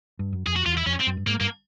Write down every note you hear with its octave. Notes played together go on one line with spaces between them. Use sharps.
G2
F#2
F2 G#4
F#4
E2 F4
E4
F2 C#4
C4
F#2
G2
G#2 A#3
G2 A#3